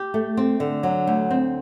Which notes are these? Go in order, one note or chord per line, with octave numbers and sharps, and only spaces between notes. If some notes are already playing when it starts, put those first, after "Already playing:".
Already playing: G4
A3
C4
D3
F#3
D2
C4